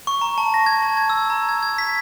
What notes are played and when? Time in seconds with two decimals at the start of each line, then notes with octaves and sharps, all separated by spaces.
0.07 C#6
0.21 A#5
0.38 A5
0.54 A#6
0.66 G#6
0.82 A5
0.97 G#6
1.10 E6
1.30 A#5
1.49 G#6
1.63 G#6
1.78 B6